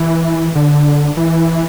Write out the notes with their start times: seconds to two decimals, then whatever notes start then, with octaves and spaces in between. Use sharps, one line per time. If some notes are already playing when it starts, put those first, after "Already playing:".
Already playing: E3
0.55 D3
1.17 E3